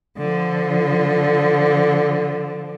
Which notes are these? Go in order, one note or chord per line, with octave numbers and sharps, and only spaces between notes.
D3 F3